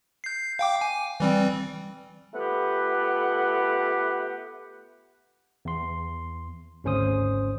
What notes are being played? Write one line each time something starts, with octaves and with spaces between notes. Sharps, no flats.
G6 C7
F5 G5 D6
G#5
E3 G3 C4
A3 B3 F4 G4 B4 F#5
E2 C6
G#1 D2 C#4 C5 D#6